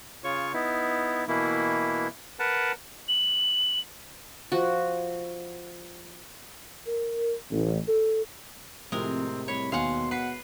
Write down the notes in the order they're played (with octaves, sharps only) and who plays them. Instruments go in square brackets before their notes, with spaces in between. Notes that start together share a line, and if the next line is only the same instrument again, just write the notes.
[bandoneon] C#3 F4 C#5 C#6
B3 D#4 E4
B2 E3 A#3 E4
A#4 B4 F#5 A5
[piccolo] F#7
[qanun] F3 F#4
[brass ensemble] A#4
A1
A4
[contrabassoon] F2 [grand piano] A2 C3 [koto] G#3 A#4 [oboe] C4
[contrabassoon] C2 [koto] C#5 [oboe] B5
[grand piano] D#2 G#5 [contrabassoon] B2 [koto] F5 F#5 [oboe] C6
[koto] B4 [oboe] F#5 [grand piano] C7